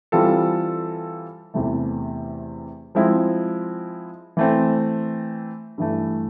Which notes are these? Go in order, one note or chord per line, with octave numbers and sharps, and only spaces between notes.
E3 G3 C4 F4 A4
E2 C3 E3 A3
F3 G#3 C4 E4
E3 A3 C4
G2 E3 A3